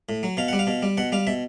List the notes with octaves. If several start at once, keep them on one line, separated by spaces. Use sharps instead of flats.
A2
F#3
B2 F5
G3 F#5
F5
B2
G3
B2 F#5
G3 F5
B2 E5